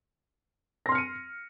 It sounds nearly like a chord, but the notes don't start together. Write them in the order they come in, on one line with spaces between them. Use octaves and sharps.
A#6 C6 F6 C#7 D#7